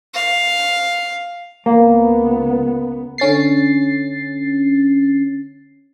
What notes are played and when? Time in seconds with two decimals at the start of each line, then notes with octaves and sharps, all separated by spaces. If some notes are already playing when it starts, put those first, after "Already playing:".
0.14 F5
1.66 C#2 A#3 B3
3.18 D3 C#4 A6 C7